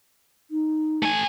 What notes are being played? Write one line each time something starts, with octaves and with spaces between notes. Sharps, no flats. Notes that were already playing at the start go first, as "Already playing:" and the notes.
D#4
A3 G#5